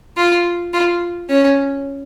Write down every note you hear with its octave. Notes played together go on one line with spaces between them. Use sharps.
F4
F4
C#4